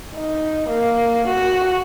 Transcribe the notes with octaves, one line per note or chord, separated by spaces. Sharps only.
D#4
A#3
F#4